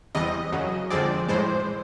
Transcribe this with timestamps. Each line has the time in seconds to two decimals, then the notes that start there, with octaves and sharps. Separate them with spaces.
0.15 E2 C3 E3 G3 D#5
0.52 F#2 C#3 F#3
0.90 F2 D3 F3 G#3 C4 D5
1.28 A2 E3 G#3 C5